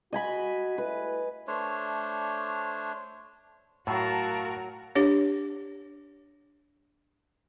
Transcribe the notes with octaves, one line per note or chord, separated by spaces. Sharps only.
F#4 D#5 G#5 B5
G3 A3 E4 B4
A3 D4 C5 C#5
A2 F#3 F#4 A#4 F5 A5
D4 G4 C#5